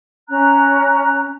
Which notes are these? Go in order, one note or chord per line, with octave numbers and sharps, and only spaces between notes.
C#4 A#5 F#6